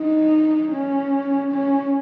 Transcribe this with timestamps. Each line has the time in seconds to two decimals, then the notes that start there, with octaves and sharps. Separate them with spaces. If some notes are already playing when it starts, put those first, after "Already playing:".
Already playing: D#4
0.72 C#4
1.52 C#4